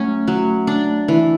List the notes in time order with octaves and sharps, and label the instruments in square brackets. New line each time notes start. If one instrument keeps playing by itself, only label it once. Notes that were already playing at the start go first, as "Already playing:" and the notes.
Already playing: [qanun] F#3 C#4 [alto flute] A3
[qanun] F#3
D4
E3